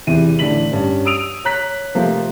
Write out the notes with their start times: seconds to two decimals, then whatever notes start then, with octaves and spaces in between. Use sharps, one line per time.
0.07 E2 C3 E4 D#7
0.39 A1 A2 D3 D5 B6 F#7
0.72 G2 C#4
1.05 D#6 E6 D7 D#7 F7
1.45 C#5 A#5 F#6 B6
1.95 C3 F3 G3 A3 A#3 C4